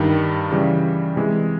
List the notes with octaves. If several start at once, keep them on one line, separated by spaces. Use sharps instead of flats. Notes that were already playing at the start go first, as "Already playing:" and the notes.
Already playing: G2 D#3 G3
C#3 E3 G3
C3 E3 G#3